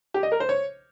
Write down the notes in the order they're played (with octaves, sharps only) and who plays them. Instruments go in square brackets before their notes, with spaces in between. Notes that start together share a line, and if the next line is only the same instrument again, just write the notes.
[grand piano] G4
D#5
A#4
C5
C#5